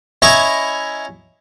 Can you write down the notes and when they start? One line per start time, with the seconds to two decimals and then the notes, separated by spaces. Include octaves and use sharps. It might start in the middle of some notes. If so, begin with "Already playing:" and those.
0.22 C#4 E4 C#5 D#5 A#5 C#6